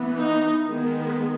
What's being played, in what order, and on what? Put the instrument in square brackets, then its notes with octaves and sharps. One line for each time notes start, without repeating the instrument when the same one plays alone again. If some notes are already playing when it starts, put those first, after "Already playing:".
Already playing: [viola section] E3 B3
D#4
D#3 G#3 B3